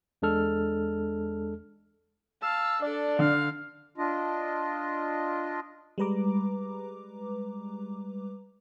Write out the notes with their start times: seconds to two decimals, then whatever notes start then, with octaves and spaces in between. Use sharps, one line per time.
0.22 E2 G#3 D4 A4 F6
2.42 F5 A5 E6
2.82 D4 A4 D5
3.19 D3 F5
3.98 D4 F4 D#5
5.98 G3 G#3 B4 A#5 D6